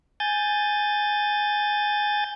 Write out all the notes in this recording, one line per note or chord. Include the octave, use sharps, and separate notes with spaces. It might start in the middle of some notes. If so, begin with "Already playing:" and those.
G#5 G6 A6